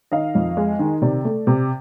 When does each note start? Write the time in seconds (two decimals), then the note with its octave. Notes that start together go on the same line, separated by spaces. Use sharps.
0.12 D#3 D#5 F5
0.35 F2
0.57 G#3
0.79 D#3
1.02 C3 D5
1.25 A3
1.47 C3